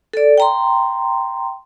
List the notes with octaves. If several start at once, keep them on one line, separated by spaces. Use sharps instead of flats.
A4 D5
G5 A#5 C6